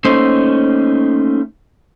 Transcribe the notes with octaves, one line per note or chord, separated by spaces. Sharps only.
A3 A#3 C#4 D#4 A4 C5